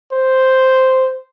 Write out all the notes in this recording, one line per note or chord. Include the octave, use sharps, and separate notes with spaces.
C5